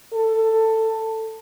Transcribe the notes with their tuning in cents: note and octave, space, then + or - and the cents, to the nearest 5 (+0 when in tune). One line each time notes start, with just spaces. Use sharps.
A4 +15